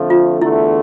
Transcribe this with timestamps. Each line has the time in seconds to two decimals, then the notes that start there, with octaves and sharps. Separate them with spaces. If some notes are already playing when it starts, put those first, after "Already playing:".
Already playing: F2 D3 F3 A3
0.10 F4
0.41 E2 D3 A3 E4